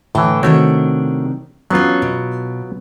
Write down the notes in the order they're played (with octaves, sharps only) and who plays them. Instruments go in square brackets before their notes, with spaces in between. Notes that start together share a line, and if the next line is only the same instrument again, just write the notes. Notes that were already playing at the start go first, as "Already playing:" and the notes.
[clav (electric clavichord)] A2 E3 [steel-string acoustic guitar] D3 G5
[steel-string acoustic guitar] C3 D#3 D4 [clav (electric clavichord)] A3 F#4 C#5
[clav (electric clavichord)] F#3 B3 F4 [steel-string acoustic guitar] C#4 D4
[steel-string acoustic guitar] B2